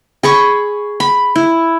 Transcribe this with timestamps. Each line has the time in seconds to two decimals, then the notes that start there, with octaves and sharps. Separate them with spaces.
0.23 G#4 B5 C#6
1.00 B5
1.36 E4